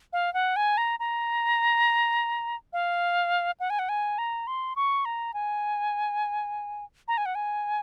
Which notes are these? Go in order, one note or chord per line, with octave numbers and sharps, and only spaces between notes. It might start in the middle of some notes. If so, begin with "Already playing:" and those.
F5
F#5
G#5
A#5
A#5
F5
F#5
G#5
F#5
G#5
A#5
C6
C#6
A#5
G#5
A#5
G#5
F#5
G#5